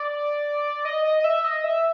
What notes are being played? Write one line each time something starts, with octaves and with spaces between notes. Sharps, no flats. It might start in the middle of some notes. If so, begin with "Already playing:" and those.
Already playing: D5
D#5
D#5
D#5
E5
D#5
E5